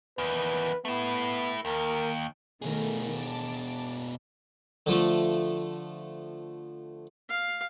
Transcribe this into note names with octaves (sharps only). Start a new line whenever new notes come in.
E2 D#3 B4
A3 B3 E4
D#2 A#4
B2 D#3 A3 G#4 A#4
A5 D6
D3 F3 A3
F5